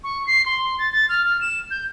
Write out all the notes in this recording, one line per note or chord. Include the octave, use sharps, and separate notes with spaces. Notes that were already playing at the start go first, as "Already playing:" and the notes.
C#6
C7
C6
A6
A6
F6
F6
E7
G6